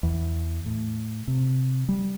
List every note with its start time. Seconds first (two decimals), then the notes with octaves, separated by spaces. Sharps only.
0.03 E2
0.66 A2
1.28 C3
1.89 G3